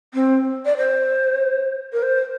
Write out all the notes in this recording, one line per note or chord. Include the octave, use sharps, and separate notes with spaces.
C4
D5
C5
A#4
C5